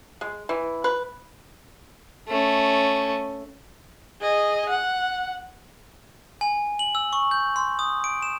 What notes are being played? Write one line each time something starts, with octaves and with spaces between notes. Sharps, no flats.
G#3
E3
B4
A3 C#4
G#4 D#5
F#5
G#5
F#7
E6
C#6
G6
C6
D#6
D7
E7